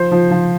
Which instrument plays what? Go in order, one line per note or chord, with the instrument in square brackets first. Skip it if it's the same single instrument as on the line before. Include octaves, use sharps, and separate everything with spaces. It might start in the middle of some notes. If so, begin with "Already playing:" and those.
Already playing: [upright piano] F3 C5
F3
F3